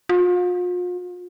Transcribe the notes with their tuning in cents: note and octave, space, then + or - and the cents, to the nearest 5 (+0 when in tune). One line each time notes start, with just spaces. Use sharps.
F4 +40